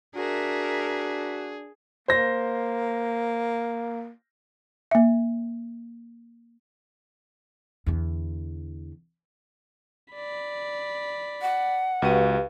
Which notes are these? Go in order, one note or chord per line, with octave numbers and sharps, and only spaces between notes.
D4 F#4 G#4 A#4 E5
A#3 C5 A#6
A#3 E5
E2 D3
D5 B5
F#5
C#2 F#4 G4 B4 F5 D#7